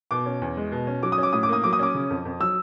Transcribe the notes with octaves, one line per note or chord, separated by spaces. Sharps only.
B2 D6
C#4
E2
G#3
B2
C#4
F#3 D6
D#6
C#4
D6
A2 D#6
D6
A#3 D#6
F#3 D6
D#6
C#4 D6
C#3
F2
F2
F#3 E6